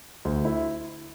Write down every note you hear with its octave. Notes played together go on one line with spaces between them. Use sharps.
D2
E4